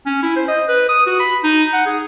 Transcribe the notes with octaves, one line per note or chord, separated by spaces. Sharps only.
C#4
E4
C5
D#5
B4
D#6
F#4
B5
D#4
F#5
G#4